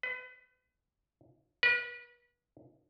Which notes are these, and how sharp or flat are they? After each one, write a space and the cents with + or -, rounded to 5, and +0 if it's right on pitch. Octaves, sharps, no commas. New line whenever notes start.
B4 +35
B4 -35